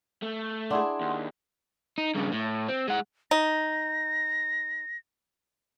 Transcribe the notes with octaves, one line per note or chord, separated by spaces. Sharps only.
A3
D4 E4 G#4 F#5 C6
D#2
D#4
G2 C#3
A2
C4
G#3 F#5
D#4 A#6